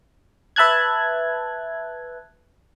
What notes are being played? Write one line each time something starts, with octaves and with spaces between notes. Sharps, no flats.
B4 E5 A5 F#6 G#6